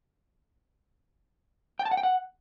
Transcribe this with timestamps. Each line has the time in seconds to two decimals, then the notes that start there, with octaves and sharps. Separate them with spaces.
1.79 G5
1.85 A5
1.91 F#5
1.97 G5
2.03 F#5